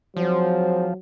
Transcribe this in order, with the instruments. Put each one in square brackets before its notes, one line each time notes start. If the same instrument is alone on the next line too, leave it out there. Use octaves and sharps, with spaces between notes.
[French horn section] G#2 C4 C5 [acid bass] F3 [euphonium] F#3